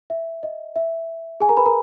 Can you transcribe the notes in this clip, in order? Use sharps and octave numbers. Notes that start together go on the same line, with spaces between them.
E5
D#5
E5
G#4 G#5
A#4 A#5
B4 B5
A#4 A#5